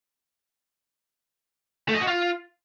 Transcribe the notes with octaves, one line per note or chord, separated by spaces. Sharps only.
A3
D#5
F#4
F4